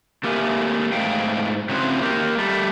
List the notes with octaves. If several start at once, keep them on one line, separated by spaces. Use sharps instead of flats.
A3 A#3 G4 A#4 E5 G#5
G#2 A3 F5 G5
C#3 C4 E4 F#4 C5
A#3 G4
G3 A3